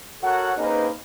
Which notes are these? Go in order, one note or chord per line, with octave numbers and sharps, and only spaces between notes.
F#4 A4 A#4 C#5 F#5
A#3 C4 C#4 D#4 G#4 B4